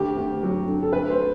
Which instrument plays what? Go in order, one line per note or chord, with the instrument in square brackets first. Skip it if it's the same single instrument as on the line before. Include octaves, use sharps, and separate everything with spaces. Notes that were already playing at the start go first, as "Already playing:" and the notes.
Already playing: [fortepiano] D2 G4
D2
F#3
D3
A4
D2 B4
C5
A3